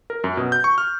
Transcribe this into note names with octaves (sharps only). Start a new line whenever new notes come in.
A#4
F#2
B2
G6
C#6
F6